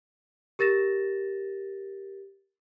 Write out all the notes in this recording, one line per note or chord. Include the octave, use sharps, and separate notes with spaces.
G4 A#4 A6 A#6 E7